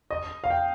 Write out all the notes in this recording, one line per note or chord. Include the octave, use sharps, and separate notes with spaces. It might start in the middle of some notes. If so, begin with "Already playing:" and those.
D#5
F5
G5